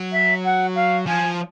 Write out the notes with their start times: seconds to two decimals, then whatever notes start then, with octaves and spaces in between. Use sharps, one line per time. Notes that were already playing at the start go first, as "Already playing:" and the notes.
Already playing: F#3
0.12 E5
0.44 F#5
0.75 F5
1.06 F3 G#5